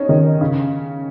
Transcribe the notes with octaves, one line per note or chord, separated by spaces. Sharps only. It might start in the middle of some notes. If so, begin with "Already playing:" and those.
Already playing: C#4 D#4
D#3
C#3